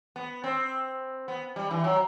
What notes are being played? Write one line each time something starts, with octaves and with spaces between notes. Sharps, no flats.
B3
C4
B3
G3
E3
F#3